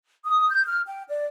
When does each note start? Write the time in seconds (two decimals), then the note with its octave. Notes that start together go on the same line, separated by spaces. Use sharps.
0.25 D#6
0.51 G6
0.66 F6
0.86 G5
1.08 D5